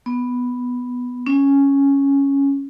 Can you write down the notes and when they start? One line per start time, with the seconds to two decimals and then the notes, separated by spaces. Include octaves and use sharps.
0.06 B3
1.26 C#4